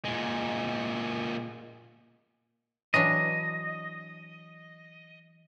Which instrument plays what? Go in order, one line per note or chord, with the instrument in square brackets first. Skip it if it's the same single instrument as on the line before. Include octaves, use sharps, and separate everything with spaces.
[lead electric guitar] A#2 G#3
[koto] E3 F#3 D4 [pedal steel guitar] D#5